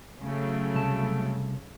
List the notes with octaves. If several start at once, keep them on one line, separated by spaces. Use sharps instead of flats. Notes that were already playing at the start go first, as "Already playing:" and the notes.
C#3 F#3 A3
C2 A5